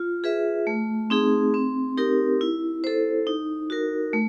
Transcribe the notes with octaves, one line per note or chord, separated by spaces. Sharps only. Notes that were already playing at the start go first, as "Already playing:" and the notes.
Already playing: F4
G#4 B4 E5
A3
C4 D#4 G#4
C4
D#4 G4 A#4
E4
A4 C5
D#4
F#4 A#4
A3